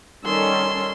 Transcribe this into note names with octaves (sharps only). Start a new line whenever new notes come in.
D#3 G3 C#4 A4 C6 E6